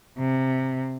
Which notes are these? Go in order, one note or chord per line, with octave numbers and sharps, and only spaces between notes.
C3